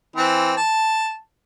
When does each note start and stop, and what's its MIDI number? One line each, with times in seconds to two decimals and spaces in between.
0.16 0.56 52
0.16 0.56 60
0.57 1.17 81